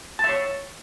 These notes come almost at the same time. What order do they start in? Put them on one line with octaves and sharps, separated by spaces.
A5 E5 C#5